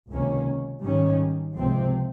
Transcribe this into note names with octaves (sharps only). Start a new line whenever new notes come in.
C#2 C3 D#3 A#3 C#4
G#2 D#3 G3 C#4
C#2 C3 F3 C4